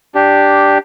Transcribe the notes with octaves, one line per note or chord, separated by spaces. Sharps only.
D4 G4